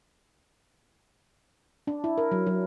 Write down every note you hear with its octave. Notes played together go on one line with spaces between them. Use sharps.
D4
E4
A#4
F#3
F#3